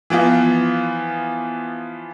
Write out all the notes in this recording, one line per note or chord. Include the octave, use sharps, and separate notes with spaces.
E3 F3 B3 F4